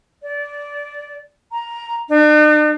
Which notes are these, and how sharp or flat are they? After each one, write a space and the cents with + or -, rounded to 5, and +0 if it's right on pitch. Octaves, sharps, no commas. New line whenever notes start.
D5 -15
A#5 +10
D4 +45